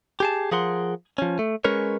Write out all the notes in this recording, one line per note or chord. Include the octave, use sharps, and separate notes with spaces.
G4 G#4 A5
F3 G#4 A#4 F#5 C6
F3 C#4
A3
G#3 C#4 A#4 B4 C#5